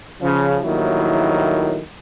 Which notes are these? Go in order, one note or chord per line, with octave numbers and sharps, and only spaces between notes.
C#3 F3
A#1 D#2 A2 D#3 F#3 E4